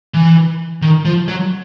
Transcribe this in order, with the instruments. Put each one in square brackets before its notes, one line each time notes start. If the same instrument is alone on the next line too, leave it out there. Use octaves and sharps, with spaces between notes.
[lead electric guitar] E3
D#3
F3
F#3